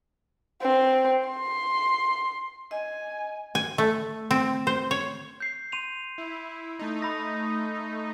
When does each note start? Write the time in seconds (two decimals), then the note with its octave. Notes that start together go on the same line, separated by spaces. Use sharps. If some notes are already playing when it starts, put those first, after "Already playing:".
0.62 C4
1.29 C6
2.71 D#5 G#5
3.55 G#5
3.78 A3
4.31 C4
4.67 C5
4.91 C#5
5.40 G6 C7
5.72 C6 D#7 F7
6.18 E4
6.79 A3 D#4
7.02 B5 D#6 A#6